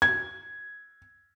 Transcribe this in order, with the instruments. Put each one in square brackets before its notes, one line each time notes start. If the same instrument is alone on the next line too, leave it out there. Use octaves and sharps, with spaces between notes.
[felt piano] G#6